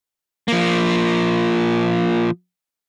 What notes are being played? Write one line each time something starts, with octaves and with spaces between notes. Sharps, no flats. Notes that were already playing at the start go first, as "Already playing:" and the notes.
F3 A#3